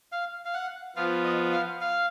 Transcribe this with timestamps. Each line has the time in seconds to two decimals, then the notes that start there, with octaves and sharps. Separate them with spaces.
0.12 F5
0.45 F5
0.54 F#5
0.96 F3 B3 F4 F5
1.24 D#5
1.53 F5
1.81 F5